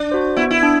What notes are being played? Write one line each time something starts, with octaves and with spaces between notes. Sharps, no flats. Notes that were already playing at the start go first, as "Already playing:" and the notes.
Already playing: D4
F#4 C5
B3 E4
E4
D4